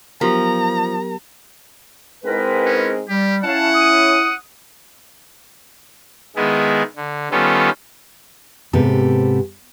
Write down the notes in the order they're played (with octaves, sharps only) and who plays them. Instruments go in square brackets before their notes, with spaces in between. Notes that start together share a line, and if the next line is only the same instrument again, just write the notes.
[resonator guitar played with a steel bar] F3 [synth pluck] F#3 B3 G4 [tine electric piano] A#4 [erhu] A#5
[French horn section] G#2 G#3 C4 [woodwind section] E4 A#4 B4
[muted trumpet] C#4
[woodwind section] G3 [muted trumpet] G4
[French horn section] C#4 E4 [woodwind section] C#5 F5 A5 [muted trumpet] F#5
[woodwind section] D#6
[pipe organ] D#3 G#3 B3 E4 G#4
D3
D#3 G3 B3 C#4 F4 A4
[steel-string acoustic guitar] G#2 C3 B3 G4 A4